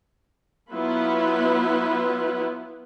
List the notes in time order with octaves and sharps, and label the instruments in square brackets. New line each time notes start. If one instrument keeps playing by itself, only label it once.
[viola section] F#3 B3 E4 F4 B4